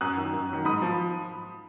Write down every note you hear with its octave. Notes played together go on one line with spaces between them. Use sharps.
F#2 D#6 F#6
D#3 F#3
F#2
D#3 F#3
G#2 B5 D#6
F3